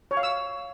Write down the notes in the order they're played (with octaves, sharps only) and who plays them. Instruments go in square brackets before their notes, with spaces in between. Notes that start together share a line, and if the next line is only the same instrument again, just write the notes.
[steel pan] C#5
F5
E6